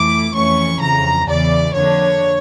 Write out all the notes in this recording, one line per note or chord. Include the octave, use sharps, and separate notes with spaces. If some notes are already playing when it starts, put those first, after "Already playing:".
Already playing: F2 E3 A3 E4 D6
F2 E3 A3 C#4 C#6
F2 C#3 E3 A#5
E2 C#3 E3 D5
F2 D3 F3 A#3 D4 C#5